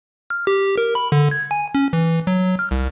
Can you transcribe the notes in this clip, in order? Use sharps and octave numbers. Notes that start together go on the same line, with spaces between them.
F6
G4
A#4
B5
D3
G#6
G#5
C#4
E3
F#3
F6
C2